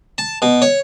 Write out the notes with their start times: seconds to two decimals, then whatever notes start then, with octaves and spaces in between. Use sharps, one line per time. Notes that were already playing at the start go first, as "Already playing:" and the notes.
0.18 A5
0.42 B2
0.62 C#5